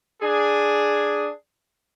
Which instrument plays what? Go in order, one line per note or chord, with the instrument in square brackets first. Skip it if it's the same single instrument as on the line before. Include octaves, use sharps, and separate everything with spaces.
[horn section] D4 G#4